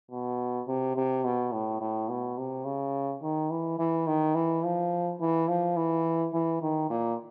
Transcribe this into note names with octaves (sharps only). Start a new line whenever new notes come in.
B2
C3
C3
B2
A2
A2
B2
C3
C#3
D#3
E3
E3
D#3
E3
F3
E3
F3
E3
E3
D#3
A#2